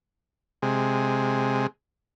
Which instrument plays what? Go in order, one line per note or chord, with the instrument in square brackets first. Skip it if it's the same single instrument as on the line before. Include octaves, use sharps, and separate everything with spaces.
[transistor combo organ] C3 G#3